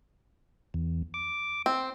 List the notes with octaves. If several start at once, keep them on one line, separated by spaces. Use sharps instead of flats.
E2
D6
C4